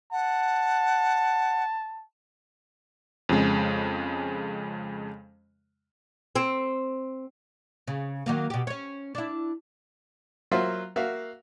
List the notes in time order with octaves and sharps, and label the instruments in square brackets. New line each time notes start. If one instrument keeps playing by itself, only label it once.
[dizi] F#5 [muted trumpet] A5
[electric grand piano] F2 C#3 G#3
[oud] C4
C#3
D#3 F#3 A#3
B2 G4
C#4 C#5
D4 E4
[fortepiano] F#3 A#3 F4 F#4 C5 E5
A#3 F#4 E5 F5